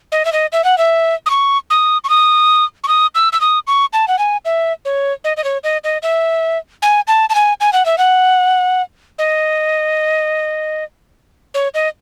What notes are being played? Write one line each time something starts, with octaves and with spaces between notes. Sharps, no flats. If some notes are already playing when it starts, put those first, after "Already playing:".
D#5
E5
D#5
E5
F#5
E5
D#6
C#6
D#6
C#6
D#6
C#6
D#6
E6
E6
D#6
C#6
A5
F#5
G#5
E5
C#5
D#5
D#5
C#5
D#5
D#5
E5
G#5
A5
A5
G#5
G#5
F#5
E5
F#5
D#5
C#5
D#5